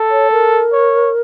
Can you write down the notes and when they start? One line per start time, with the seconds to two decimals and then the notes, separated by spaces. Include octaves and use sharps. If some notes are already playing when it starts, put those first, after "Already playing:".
Already playing: A4
0.10 C#5
0.32 A#4
0.73 C#5